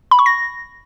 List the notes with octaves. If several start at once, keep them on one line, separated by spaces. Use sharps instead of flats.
B5
C#6
A#6